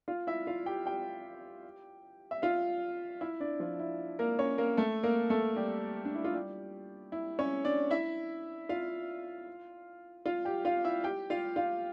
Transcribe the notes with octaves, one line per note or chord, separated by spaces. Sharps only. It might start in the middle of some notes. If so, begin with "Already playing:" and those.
F4 F5
E4 E5
F4 F5
G4 G5
G4 G5
E5
F4 F5
E4 E5
D4 D5
F3 F4
E4
A#3 A#4
C#4 C#5
A#3 A#4
A3 A4
A#3 A#4
A3 A4
G3 G4
D4
E4
F4
G3 G4
E4
C#4 C#5
D4 D5
E4 E5
F4 F5
F4 F5
G4 G5
F4 F5
E4 E5
G4 G5
F4 F5
F4 F5